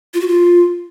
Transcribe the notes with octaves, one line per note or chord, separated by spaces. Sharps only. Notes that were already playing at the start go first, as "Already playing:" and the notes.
F4
F#4
F4